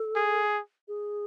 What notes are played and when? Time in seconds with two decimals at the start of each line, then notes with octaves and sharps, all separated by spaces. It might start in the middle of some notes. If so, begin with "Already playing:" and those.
Already playing: A4
0.16 G#4
0.88 G#4